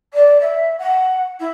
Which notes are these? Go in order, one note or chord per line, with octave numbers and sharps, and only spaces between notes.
D5
E5
F#5
E4